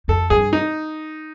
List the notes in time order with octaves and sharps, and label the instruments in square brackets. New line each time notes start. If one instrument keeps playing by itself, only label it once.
[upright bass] F2 [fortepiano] A4
[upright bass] G2 [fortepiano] G#4
[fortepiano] D#4